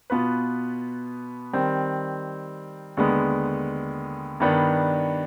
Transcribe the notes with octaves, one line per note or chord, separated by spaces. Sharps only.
B2 B3 F4 B4
D#3 G3 C4
D#2 D3 G#3 B3
G2 D#3 B3 D4